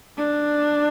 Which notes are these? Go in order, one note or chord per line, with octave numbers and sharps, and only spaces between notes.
D4